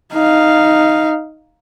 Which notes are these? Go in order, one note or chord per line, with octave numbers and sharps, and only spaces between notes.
D#4 F5